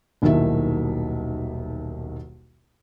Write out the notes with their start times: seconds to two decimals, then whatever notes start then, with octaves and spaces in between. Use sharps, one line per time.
0.22 D#1 B1 D#3 F#3 E4 E5